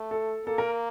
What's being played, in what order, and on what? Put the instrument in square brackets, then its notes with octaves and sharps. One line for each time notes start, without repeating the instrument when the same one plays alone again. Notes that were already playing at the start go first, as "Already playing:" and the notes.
Already playing: [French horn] A3
[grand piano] A4
[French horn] A#3 [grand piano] A4
[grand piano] A#4